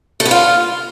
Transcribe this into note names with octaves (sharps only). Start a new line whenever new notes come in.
A3
B3
F4